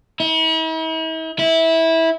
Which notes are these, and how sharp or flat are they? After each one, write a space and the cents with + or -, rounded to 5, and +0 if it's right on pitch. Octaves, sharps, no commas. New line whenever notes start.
E4 -45
E4 -15